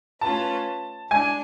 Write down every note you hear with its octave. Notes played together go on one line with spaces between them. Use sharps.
A3 C#4 F4 B4 A5
G#3 D4 G#5